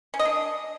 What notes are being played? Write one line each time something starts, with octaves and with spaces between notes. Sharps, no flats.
C#4
D#5
D4